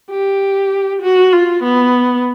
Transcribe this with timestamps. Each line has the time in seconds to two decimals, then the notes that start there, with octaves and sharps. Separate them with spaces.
0.10 G4
1.02 F#4
1.32 F4
1.63 B3